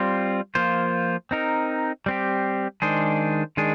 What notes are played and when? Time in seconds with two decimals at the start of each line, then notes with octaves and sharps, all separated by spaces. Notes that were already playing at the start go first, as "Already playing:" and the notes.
Already playing: G3 C4 F4
0.55 F3 A#3 F4 C5
1.31 C4 D#4 A#4
2.06 G3 C4 G4
2.82 D#3 G#3 D4 G#4 C5
3.57 D#3 G#3 D4 G#4